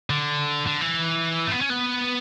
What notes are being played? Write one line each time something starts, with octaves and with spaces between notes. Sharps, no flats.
D3
D3
E3
A3
B3
C#4
B3